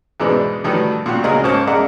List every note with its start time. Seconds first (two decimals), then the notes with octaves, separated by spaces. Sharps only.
0.20 E2 G#2 B2 E3 G#3 D4
0.64 A2 D#3 E3 F#3 G3 A3
1.06 A#2 G3 F#4 G4
1.24 C#2 A#2 F#3 G#4 A#4 D#5
1.44 G#2 A#3 C5 C#5 A5 F6
1.67 G#3 D4 A#4 D#5 E5 F#5